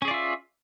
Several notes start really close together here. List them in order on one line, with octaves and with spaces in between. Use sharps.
C#4 G#4 D5 F4 E5